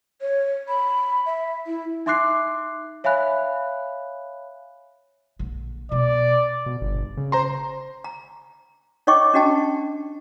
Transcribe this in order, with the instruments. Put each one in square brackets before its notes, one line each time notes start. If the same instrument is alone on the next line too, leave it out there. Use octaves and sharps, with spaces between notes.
[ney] C#5
B5
E5
E4
[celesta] D#4 E5 C6 D6 F#6 C7
C#5 E5 F5 G#5 B5 F#6
[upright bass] A#1 D3
[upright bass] B2 B3 [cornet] D5
[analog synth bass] B2
G1
C#3
[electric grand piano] C5 A#5 C6
[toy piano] A#5
D#4 C#5 D#5 G5 C#6 D6
C#4 D4 F#4 D#5 G5 A5